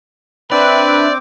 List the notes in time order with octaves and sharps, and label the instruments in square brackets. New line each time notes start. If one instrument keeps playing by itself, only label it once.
[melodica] C4 G5 D6 [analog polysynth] D4 E5 F#6 [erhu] B4 [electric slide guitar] D5